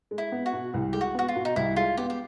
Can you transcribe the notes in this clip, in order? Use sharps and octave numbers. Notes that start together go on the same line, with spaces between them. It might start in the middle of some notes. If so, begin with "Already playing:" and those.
G#3
E4
B3
F#4
B2
C2
G#3 G4
F#4
B3 F#4
F4
B2
D#4
C2 E4
G#3 F4
B3 G4
G4